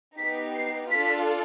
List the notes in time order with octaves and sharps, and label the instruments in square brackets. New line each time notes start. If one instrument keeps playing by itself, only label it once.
[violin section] B3 D#4 G4 B6
C7
D4 F4 A4 B6